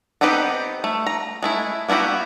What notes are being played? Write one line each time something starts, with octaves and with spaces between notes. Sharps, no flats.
B3 C4 D#4 G4 B4
A3
A#5
G#3 A3 E4
A#3 B3 E4 F#4 G4